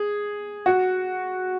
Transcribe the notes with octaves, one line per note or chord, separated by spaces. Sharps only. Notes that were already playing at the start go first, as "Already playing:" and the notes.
Already playing: G#4
F#4